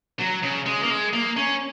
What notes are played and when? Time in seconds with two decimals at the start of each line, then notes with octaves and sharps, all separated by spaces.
0.20 F#3
0.43 C#3
0.66 G#3
0.83 A#3
0.90 G#3
1.13 A#3
1.37 C#4